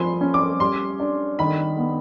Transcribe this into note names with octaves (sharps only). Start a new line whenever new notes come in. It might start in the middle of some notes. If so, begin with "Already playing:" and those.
Already playing: F3 G#5 B5 C6
C#4
D6
G3 C6
D4
D#3 B5
B3